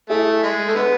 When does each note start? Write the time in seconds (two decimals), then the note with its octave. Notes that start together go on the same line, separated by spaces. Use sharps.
0.10 A3 E4 G#4
0.43 G#3
0.68 A3
0.75 D3 G#3 B3